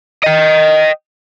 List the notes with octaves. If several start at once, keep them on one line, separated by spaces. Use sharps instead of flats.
D#5 G5